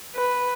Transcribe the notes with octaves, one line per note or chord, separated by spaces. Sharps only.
B4